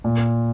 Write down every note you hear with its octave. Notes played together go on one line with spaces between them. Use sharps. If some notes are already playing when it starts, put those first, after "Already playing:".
A#2